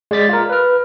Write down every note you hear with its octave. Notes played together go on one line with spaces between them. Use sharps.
G#3 D5 A6 B6
F4 A#4
B4 F6